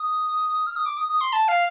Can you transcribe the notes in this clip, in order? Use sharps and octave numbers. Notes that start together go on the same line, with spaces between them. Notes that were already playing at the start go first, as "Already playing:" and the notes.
Already playing: D#6
F6
D#6
D6
D#6
D#6
C6
A5
F5